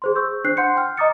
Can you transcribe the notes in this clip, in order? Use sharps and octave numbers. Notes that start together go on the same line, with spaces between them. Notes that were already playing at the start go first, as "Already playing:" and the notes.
G#4 C5 C6
C#6 E6 G6
D4 C5 F#6 C7
F#5 C6 G6 C#7
G5 F6
D#5 A#5 D6 D#6 A6 C#7